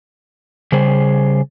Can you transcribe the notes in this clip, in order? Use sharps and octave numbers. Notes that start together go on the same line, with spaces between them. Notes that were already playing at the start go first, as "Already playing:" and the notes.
C#3 G3 G#4 C5